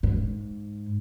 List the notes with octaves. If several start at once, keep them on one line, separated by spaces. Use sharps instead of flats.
G#2